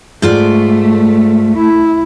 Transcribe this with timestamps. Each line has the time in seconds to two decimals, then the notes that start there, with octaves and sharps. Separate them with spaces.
0.22 G#2 A3 F4 D5
1.56 E4